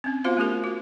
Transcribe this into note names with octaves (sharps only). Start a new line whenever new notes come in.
C4 C#4
B3 F4 F#4 C5 F5
A3 C#4 G4 A#4
F#4